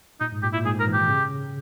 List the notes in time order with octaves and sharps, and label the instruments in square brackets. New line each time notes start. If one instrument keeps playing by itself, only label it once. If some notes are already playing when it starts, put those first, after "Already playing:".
[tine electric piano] A#2 [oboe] D#4
[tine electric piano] G#2
[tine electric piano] A#2 [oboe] G4
[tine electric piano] A#2 [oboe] E4
[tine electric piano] G#2 [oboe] G#4
[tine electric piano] G#2
[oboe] A#4
[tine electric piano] E3
[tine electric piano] D#3 [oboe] G4
[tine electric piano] C#3